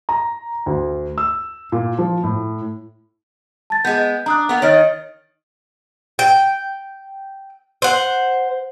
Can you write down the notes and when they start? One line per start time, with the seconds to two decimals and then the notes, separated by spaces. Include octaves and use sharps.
0.09 A#5
0.66 D2
1.18 E6
1.72 A#2
1.98 F3
2.24 A2
3.70 A5 A6
3.85 G#3 B3 G6
4.26 D4 A#5 D#6 F#6
4.49 A#3 B3
4.62 D#3 C#5 D#5 F6 A6
6.19 G5
7.82 C5 F#5